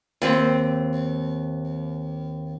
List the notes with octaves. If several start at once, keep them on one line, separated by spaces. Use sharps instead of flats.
D#2 C4